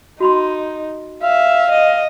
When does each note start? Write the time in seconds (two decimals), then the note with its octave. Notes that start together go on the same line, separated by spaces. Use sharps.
0.20 D#4 F#4 B5 C6
1.23 E5 F5
1.72 D#5